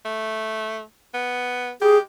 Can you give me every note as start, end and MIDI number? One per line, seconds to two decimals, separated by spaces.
0.05 0.82 57
1.14 1.71 59
1.82 2.00 67
1.82 1.97 68